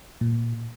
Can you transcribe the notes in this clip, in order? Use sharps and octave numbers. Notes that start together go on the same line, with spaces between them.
A#2